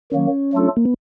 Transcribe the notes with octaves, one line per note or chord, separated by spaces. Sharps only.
D#3 F#3 A#3 C#4
F#3 A3 D4 F4 A4
A#3
B3